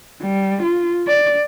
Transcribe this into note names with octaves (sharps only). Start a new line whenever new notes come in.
G3
F4
D5